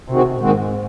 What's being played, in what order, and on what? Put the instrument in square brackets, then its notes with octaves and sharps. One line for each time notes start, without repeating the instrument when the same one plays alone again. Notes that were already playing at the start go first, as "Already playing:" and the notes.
[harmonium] D#2 D#3 G#3 C4 F#4 [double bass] C3
[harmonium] D#2 D#3 G#3 C4 F#4 [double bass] G#2